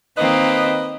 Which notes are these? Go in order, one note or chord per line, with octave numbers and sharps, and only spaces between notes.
D#3 A#3 C4 B4 D#5